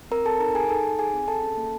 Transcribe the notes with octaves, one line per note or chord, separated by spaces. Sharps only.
C4 A#4 A#5
C4 A4 A5
D#4 A#4 A#5
G#4 G#5
D#4 A4 A5
D#4
G#4 G#5
C4
G#4 A4 A5
C#4
A#3